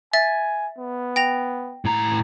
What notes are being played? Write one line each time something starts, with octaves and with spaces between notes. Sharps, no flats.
E5 G#5 A6
B3
G5 A#6 F7
A2 A#5